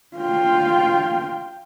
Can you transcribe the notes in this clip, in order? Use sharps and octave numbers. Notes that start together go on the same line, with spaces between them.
F4 G5